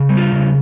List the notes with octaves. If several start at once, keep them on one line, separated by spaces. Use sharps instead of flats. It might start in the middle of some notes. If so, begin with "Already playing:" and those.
Already playing: C#3
G3
F4
C#3